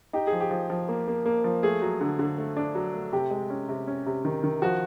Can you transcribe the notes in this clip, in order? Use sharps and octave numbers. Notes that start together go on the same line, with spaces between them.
D#4 G4
G#4
F3
G4
F3
F3
A#3
A#3
A#3
F3
A3 G#4
F#3
D3
D3
A3
D4
F#3
A3
C3 G4
G#3
C#4
C3
C#4
C3
D#3
D#3
F3 F#4